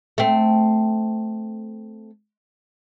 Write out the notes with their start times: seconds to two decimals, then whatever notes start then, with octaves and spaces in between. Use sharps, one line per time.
0.18 A3 C4